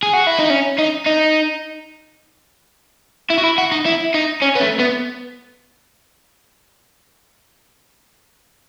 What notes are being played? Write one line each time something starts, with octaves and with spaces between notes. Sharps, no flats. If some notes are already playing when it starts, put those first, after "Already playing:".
G#4
F#4
E4
D#4
C#4
D#4
D#4
E4
F#4
E4
F#4
D#4
E4
D#4
C#4
B3
A3
B3